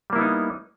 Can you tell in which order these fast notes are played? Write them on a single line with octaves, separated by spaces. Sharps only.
G3 A#3 E4 B3 D#4